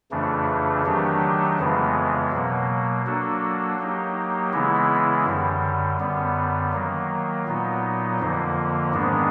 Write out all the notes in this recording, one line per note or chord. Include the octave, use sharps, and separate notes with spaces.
F2 C#3 E3 A3 D4
D#3 F#3 A3 D4 G4
F2 C#3 E3 G#3 B3
B2 F#3 A#3
F#3 A#3 D4 F#4 A4
F#3 A#3 D#4 G4
C#3 E3 G#3 B3 E4
F#2 D3 G3
F#2 D3 G3 B3
D#3 F#3 A#3
A#2 F#3 B3 D#4
F2 D3 F3 A#3
G#2 D#3 G#3 B3 D4